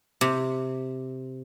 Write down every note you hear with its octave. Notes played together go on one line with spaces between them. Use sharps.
C3